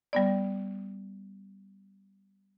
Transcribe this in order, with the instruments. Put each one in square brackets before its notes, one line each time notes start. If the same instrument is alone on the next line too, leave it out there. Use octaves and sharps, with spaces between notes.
[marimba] G3 B3 D5